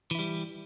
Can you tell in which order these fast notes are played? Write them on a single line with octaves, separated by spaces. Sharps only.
E3 E4 G3